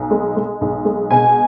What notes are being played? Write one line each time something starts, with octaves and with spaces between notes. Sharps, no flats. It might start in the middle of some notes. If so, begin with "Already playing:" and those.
Already playing: B1
G#3
G#3
B1
G#3
B2 G#5